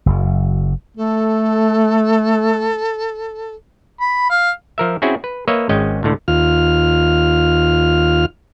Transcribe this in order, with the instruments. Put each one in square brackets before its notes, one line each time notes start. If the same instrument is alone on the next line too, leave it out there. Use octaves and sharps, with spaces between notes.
[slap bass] F#1 F#2
[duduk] A3 [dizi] A4
[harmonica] B5
F5
[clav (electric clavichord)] F3 A#4 E5
C4 C#4 E4 F#4 G#4
B4
A#3 B4 C#5 D#5 E5
G#1 G#3 C#4 D#5 G5
C#2 A2 D3
[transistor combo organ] D#2 F4 F6